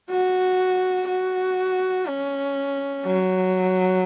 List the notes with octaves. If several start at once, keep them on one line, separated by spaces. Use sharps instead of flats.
F#4
F#4
C#4
F#3